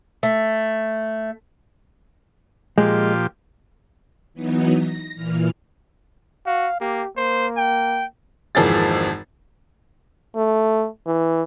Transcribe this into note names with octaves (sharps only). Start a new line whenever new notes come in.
A3
A#2 F3 G#3 G4
E3 F#3 B3 D#4
A#6
A#2 E3 F6
F#4 F5
A#3 G4
A#3 C5
G5
G#1 F2 E3 A#3 G#4 A6
A3
E3